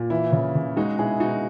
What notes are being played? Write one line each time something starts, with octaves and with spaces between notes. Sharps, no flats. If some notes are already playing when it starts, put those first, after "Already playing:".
Already playing: A#2
E3 E4
C#3
C#3
G#3 D#4 F#4
B2 E4 G#4
B2 D#4 F#4